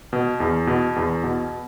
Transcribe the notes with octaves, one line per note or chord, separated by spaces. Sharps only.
B2
E2
B2
E2
B2